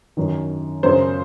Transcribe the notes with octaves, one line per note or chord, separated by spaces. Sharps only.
F#2 D#3
F#2 C#3 C5